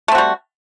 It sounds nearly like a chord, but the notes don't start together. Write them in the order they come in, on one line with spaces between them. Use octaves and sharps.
A3 C4 F#4 G3